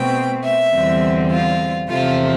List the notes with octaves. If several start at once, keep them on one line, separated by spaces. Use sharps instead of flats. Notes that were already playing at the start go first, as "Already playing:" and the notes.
Already playing: B2 A3 C4 G5
E5
E2 D3 G3 C4
F4
E2 C3 F3 A3 F4